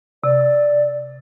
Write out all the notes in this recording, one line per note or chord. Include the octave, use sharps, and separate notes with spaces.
C3 D5